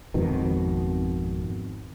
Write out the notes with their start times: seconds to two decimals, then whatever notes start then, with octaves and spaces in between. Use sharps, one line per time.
0.14 G#1 F2 B2 D#3